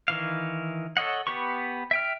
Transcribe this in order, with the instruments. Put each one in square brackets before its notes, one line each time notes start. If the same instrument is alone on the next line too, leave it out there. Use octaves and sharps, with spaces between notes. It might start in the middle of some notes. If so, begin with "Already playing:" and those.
[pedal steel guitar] D#3 E3 F5
A4 C#5 D#5 F#5
B3 G4 B4 C#6
E5 G5 F6